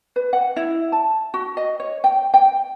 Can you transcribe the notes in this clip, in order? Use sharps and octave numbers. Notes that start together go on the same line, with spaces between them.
B4
F#5
E4
A5
F#4
D#5
C#5
G5
G5